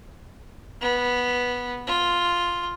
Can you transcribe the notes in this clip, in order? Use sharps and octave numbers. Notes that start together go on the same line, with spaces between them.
B3
F4